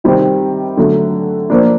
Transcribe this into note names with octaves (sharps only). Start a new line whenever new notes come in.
C3 D#3 G3 C4
D3 F#3 A3
F3 A#3 D4